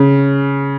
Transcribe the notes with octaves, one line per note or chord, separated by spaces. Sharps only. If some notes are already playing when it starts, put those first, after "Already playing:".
Already playing: C#3